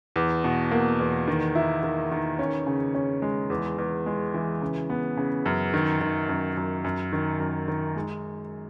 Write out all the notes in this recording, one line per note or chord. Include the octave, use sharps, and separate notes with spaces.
E2
B2
A#3
E2
D#3
E4
D#3
D#3
C#4
C#3
C#4
G#3
E2
E2
G#3
E3
C#3
B3
C#3
F#2
D#3
D#3
F#2
F#2
F#2
D#3
F#2
D#3
G#3